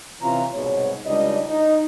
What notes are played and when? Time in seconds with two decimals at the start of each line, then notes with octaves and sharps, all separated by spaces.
0.22 C3 E3 C#4 F4 A#5
0.54 C2 G#2 B2 C#5
1.06 C#2 C#3 G3 D4 D#4 D#5
1.48 D#4